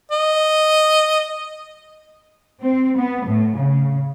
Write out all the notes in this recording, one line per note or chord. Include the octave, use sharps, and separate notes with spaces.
D#5
C4
B3
A2
C#3